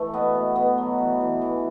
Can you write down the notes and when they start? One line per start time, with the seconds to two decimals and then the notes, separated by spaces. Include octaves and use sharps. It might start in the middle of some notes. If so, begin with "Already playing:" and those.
Already playing: E3 A3
0.14 B2 B3
0.35 B2
0.56 B2 B3
0.78 F#3
0.98 E3
1.21 E3
1.42 E3